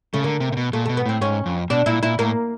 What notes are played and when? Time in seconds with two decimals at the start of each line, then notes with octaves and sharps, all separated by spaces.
0.14 C#3 A3
0.24 D3 A#3
0.40 C3
0.52 C3
0.57 B2
0.73 A#2 A3
0.85 A3
0.89 B2
0.97 B3
1.06 A2 C4
1.21 G#2 C#4
1.46 F2
1.70 B2 D4
1.86 A#2 E4
2.03 A#2 E4
2.19 A2 A#3